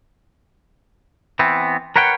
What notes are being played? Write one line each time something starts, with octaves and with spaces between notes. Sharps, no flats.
E3 B3 C4
A#4 B4 C#5 F#5 G5